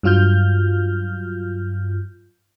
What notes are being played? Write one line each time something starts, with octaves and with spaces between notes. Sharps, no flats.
G2 F#3 F4 F6 G6